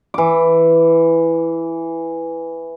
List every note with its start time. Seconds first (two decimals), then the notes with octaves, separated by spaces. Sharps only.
0.14 E3 D6